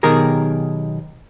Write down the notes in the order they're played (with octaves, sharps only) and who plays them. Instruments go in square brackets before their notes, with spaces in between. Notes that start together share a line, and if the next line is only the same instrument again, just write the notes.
[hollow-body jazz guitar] B1 B2 D#3 G4 G#4 A#4